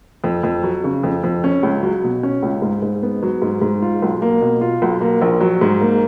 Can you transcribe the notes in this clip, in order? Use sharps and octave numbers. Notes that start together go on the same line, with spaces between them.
F2
F2
F#3
C#3
F2
F2
C#4
C#2
F#3
B2
C#4
C#2
G#2
G#2
B3
F#3
G#2
G#2
F4
B1
A#3
B2
F4
B1
A#3
A#1
F#3
G#2
A#3